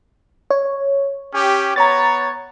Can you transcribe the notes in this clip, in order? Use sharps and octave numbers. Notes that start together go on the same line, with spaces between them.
C#5
C#4 G4
B3 C#5 A#5 A6